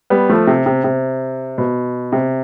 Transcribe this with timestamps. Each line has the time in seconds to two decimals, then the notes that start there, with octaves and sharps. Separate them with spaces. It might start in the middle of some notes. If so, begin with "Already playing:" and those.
0.10 G3 B3
0.29 F3 A3
0.47 C3
0.66 C3
0.84 C3
1.58 B2
2.12 C3